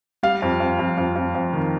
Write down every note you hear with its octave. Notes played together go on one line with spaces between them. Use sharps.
G3 F5
F2
F2
F2
F2
F2
F2
D#3